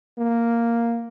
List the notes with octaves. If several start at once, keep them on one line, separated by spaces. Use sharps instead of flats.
A#3